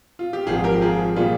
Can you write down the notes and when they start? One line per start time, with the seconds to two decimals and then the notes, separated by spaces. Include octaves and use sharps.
0.19 F4
0.33 G4
0.46 G#1 G#2 F3 F4 G#4
0.64 G4 A#4
0.81 F4 G#4
1.16 A#2 G3 F4 G#4